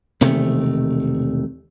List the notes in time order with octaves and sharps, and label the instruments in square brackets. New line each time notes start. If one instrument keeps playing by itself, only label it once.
[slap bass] E1 C3 D#3 A3